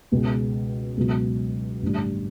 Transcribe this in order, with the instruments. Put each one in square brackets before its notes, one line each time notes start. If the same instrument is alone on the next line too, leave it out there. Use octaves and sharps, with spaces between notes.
[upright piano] C#2 B2 G#3
C#2 B2 F#3
A1 G2 D3 G3